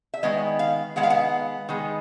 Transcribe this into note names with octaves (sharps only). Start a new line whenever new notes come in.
E5
D#3 G#3 B3 D#5
F5
D#3 G#3 B3 F#5
F5
F#5
D#3 G#3 B3